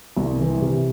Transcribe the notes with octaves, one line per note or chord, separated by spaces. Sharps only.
C2
E3
C3